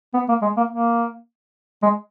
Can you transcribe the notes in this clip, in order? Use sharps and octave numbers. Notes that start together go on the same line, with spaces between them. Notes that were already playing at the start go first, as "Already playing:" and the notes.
B3
A#3
G#3
A#3
A#3
G#3